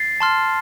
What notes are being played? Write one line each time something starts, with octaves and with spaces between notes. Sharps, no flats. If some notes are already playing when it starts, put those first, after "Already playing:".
Already playing: A6 C7
A5 C6 F6